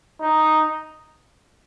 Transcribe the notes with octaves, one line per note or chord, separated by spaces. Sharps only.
D#4